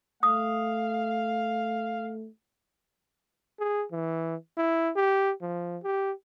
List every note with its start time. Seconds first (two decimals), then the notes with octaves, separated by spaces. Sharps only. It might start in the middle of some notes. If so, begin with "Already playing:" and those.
0.23 A3 F5 D#6
3.59 G#4
3.92 E3
4.57 E4
4.96 G4
5.41 F3
5.83 G4